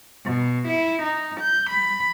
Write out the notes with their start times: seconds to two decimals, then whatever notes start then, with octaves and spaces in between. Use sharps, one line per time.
0.24 B2
0.67 E4
1.02 D#4
1.40 G6
1.70 B5